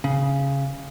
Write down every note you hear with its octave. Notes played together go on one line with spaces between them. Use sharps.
C#3